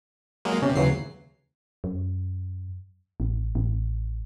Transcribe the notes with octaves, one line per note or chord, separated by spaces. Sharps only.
F#3 G#3 A#3
C3 C#4
D#2 C#3 E3 F#3 C7
F#2
A1
A1